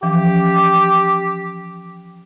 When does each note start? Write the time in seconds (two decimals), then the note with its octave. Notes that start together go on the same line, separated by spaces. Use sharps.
0.03 E3 F3 C#4 G4